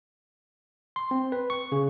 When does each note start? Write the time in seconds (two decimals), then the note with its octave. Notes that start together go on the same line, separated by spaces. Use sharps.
0.96 C6
1.11 C4
1.32 B4
1.50 C#6
1.72 C#3